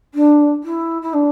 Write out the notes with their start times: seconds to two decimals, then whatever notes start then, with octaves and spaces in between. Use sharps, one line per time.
0.14 D4
0.63 E4
1.02 E4
1.13 D4